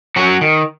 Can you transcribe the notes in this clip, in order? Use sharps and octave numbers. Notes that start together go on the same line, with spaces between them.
F#3 C#4 F#4
D#3